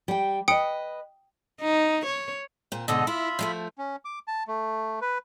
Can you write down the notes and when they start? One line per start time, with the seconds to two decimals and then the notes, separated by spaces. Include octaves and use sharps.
0.08 G3 G5
0.48 B4 D#5 G5 D#6 C#7
1.61 D#4
2.06 C#5
2.72 A#2 C4
2.88 G#2 B2 D3 A4 D#5
3.07 E4 F4 E5 B5
3.39 F3 G#3 A3
3.78 C#4
4.05 D6
4.28 A5
4.48 A3
5.01 B4